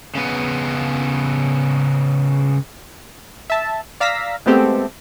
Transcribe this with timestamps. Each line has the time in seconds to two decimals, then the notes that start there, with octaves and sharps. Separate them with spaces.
0.15 C#3 B3
3.50 E5 A5
4.00 D5 F5 A#5 E6 A#6 B6
4.46 G#3 A3 B3 C4 G4 A4